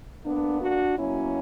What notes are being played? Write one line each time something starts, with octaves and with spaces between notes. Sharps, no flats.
D3 A#3 B3 D4
D4 F#4
B2 F#3 A#3 C#4 E4